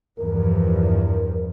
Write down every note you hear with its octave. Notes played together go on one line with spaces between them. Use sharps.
E2 G2 F3 A#4